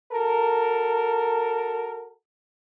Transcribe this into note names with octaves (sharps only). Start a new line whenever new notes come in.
F#4 A4 A#4